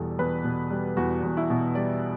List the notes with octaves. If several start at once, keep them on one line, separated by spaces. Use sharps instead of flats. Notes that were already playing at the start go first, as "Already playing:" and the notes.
Already playing: E2 B2 G3 A4
E2 B4
B2
G3
E2 F#4
E2
E4
B2
G3 D5